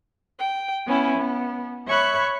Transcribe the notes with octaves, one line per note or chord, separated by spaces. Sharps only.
G5
B3 C#4 E4
B3
C#5 E5 B5 C#6 F#6